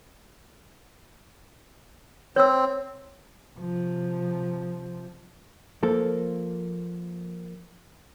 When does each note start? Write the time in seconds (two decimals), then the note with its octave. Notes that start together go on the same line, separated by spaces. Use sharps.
2.36 C4 C#5 E6
3.57 C3 F3
5.83 F3 A#3 A4